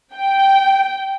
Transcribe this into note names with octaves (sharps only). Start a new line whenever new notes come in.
G5